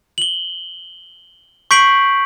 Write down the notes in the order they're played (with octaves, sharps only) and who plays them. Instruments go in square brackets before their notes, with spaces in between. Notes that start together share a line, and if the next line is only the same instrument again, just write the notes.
[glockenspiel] F#7 G7
C#6 G6 B6 C7 D7 F#7